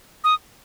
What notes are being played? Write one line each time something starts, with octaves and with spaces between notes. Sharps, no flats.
D#6